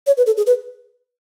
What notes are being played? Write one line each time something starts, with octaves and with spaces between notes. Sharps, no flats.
C#5
B4
A4
G#4
B4